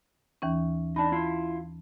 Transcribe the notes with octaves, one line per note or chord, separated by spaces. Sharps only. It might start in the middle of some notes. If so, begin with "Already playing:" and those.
D#2 E3 C#4
D4 D#4 A5 B5
E4 F4